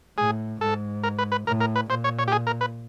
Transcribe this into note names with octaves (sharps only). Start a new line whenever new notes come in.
A2 G#4
G#2 A4
A#4
B4
B4
A2 A#4
A#4
B4
A#2 C5
C#5
C#5
G4
G#4
A#4
B4